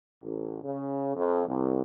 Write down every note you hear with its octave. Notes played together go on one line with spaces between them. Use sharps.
A1
C#3
F2
C2